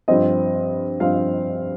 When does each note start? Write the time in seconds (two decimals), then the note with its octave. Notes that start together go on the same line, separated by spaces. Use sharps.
0.08 G2 F3 C4 D#5
1.00 G2 F3 C4 F5